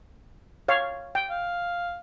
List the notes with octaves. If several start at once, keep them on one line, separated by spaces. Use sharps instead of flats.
C#5 F5
G5
F5